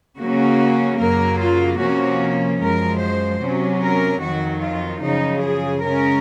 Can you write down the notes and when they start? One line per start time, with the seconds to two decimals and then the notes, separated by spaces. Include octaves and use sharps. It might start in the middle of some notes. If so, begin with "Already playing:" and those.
0.18 C#3 F#3 A#3 C#4 F#4
1.00 F#2 C#3 F#3 A#3 A#4
1.40 F4
1.80 C3 F3 A#3 C#4 F#4
2.62 F#2 F3 G#3 A#4
3.01 C5
3.43 C3 F#3 C#4
3.82 A#4
4.23 F2 D#3 F#3 F#4
4.64 F4
5.03 F#2 C#3 F3 D#4
5.45 G#4
5.85 C#3 G#3 C#4 A#4